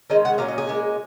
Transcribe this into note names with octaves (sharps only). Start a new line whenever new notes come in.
D#3 G#3 C#4 D#5
F#5
A#2 F#3 C#4 F5
D#5
G#4
A#2 G#3 C#4